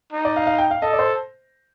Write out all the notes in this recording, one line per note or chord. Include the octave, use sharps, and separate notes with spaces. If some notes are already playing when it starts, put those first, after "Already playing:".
D#4
D5
F5
F5
G5
F5
A4 D#5
D5
C5